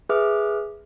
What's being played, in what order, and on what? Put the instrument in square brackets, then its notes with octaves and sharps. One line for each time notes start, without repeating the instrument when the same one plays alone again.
[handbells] G#4 B4 E5 D6 F6